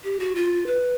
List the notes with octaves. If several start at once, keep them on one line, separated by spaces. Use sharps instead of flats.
G4
F#4
F4
B4